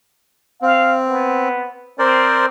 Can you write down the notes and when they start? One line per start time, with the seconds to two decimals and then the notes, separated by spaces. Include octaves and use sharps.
0.62 C4 F5
1.08 B3
1.99 C4 A#4 C5 D5